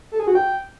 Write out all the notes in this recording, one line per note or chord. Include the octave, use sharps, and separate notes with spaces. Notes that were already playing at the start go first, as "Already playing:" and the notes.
A4
G#4
F#4
G5